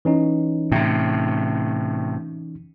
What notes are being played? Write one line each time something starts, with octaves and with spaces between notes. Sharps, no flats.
E3 C#4 D#4
A2 C3